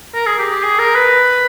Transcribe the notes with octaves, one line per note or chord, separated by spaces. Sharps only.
A#4
G#4
G4
G4
G#4
A#4
B4